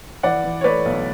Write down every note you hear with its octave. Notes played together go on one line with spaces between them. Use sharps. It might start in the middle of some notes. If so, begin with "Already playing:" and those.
E3 D5 F#5
E3
C#5
A3 B4 D5
B1